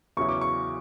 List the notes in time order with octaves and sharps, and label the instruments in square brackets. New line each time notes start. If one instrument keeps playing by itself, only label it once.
[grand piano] E2 C#3 F#3 C#4 E4 C#6
D6
C#6